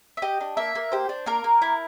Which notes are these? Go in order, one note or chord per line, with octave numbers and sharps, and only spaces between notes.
E5
G4 D#5
D4
A#3 E5
A#3
G4 C5
D4
A#3 A#4
A#3
E4